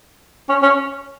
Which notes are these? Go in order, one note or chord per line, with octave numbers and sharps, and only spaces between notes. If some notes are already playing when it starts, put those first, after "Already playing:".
C#4
C#4